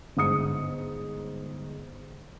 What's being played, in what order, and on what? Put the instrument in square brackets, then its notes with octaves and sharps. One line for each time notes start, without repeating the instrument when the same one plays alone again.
[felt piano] G1 G#2 D#6 C#7